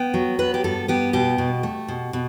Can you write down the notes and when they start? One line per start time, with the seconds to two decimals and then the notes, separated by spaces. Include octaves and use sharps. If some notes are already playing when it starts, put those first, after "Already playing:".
Already playing: B3 G5
0.14 F#3
0.39 B3 B4
0.54 G4
0.64 G2 A4
0.88 B3 G4
1.13 B2 G4
1.38 B2
1.63 A3
1.88 B2
2.13 B2